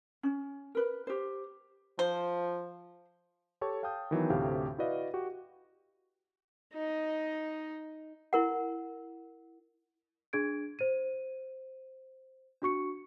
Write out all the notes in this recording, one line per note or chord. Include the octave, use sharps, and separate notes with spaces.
C#4
A#4 B4
G4 C5
F3 C5
G4 A4 C#5 A5 C#6
F5 G5 A5 D#6 G6
D#3 E3 F#3 B3
D2 A2 C3 G4 F5
E4 F#4 B4 D5 D#5 F5
F#4 G4
D#4 D#5
E4 A#4 F#5
D4 G#4 G#6 D7
C5 D#7
D4 F#4 C#6 C#7